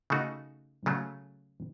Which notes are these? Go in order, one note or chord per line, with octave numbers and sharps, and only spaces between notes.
C#3 A3 D#4 F#4
C#3 F#3 A3